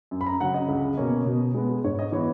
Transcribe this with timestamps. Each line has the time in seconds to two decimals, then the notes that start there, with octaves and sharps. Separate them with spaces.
0.11 F#2
0.21 B5
0.26 A#5
0.41 C#3 F#3 F#5
0.54 D#5
0.69 C#2
0.97 B2 A#3 C#4
1.26 B2
1.55 G#3 B3
1.84 G#2 C#5
1.99 D#5
2.12 E3 B3 C#5